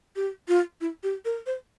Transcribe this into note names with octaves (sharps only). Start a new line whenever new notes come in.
G4
F4
E4
G4
A#4
C5